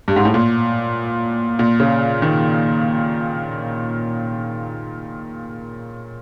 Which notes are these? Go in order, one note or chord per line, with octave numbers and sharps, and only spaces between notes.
G2
G#2
A2
A#2
A#2
C#3
D#3